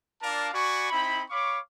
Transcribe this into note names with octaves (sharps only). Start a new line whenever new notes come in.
D4 F4 A#4 D5 F5 A5
F#4 D5 G#5 B5 C#6
C4 D#4 E4 B5
C#5 F5 B5 C#6 D6